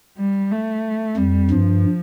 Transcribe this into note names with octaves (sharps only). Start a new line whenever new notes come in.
G3
A3
F2 G3
G2 F3